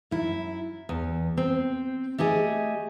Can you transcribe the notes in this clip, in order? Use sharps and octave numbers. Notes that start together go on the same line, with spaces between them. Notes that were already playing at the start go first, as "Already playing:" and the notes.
F#2 E4
E2
C4
A3 G4 G#4 D#5 G#5